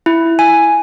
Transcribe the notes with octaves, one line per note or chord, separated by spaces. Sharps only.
E4
G#5